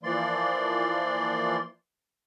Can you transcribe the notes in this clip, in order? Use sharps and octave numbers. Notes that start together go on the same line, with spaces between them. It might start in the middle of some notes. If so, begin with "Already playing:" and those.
E3 F3 A#3 D5 C6